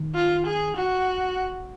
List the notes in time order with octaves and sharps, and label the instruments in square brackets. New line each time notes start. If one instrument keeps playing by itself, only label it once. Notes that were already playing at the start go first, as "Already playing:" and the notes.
Already playing: [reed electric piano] D#3
[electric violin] F4
G#4
F#4